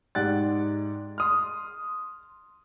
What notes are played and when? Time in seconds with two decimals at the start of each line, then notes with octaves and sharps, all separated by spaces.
0.15 G#2 G4 D5 F#5 F#6 A6
1.18 C6 D#6 F6